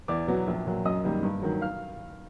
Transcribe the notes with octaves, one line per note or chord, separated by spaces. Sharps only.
E2 D5 D6
B2 F#3 B3
A#1
A#2 F#3
F#2 D#5 D#6
D#3 G3 A#3
G2
D#3 F#3
F5 F6